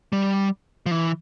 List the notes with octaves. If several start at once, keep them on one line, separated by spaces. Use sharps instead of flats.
G3
F3
E3